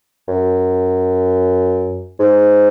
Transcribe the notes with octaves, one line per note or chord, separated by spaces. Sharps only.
F#2
G#2